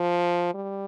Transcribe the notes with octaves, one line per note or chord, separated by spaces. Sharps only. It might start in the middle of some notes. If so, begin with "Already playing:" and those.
Already playing: F3
G3